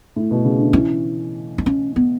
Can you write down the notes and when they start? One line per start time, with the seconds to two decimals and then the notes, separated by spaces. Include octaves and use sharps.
0.16 A2
0.31 B2
0.44 C#3
0.59 D3
0.73 E3 C#4
1.58 D4
1.66 C#4
1.96 B3